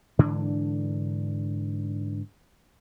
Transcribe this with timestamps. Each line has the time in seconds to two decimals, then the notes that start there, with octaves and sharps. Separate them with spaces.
0.19 G#2 D3 E3 D4